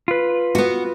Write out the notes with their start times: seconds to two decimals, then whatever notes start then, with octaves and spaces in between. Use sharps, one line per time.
0.08 F4 B4
0.55 B3 F#4